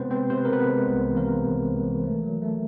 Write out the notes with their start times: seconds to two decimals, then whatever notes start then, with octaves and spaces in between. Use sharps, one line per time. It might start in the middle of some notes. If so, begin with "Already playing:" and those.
Already playing: C3 G#3 B3 C4 B4 C5
0.11 C3 C4 C5
0.30 C3 C5
0.38 B4
0.45 A#4
0.50 C3 B3 B4
0.68 G#3
0.88 C2 B3 B4
1.07 E3
1.16 A#3 A#4
1.26 C3
1.45 C2
1.65 G#3
1.84 E3
2.04 A3
2.23 F#3
2.42 A3